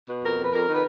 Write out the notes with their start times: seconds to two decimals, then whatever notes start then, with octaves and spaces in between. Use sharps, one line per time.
0.09 B2
0.23 F2 A#4
0.38 F2 B4
0.53 F2 A#4
0.67 D#3
0.73 B4